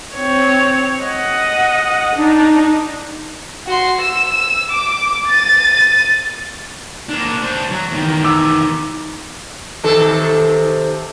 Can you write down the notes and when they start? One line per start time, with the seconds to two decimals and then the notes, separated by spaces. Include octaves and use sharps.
0.15 C4 C#5
1.04 D#5 F#5
2.16 D4 D#4
3.67 F#4 C6
4.00 E6 E7
4.70 D6
5.27 A6 D#7
7.09 A#3 D4
7.42 D4 C5
7.71 F#3
7.91 E2 D#3
8.24 D6 E6
9.84 C3 D#3 A4